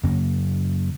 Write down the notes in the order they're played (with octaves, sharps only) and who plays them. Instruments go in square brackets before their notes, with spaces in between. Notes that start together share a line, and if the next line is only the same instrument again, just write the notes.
[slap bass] F#2 C#3 F#3 A#3